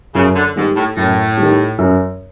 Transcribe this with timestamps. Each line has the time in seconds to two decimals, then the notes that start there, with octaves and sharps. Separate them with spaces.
0.15 F#2 C#3
0.35 D3
0.56 G#2 D#3 G3
0.76 A2
0.97 F#2 A2
1.38 D#3 G3
1.79 F#2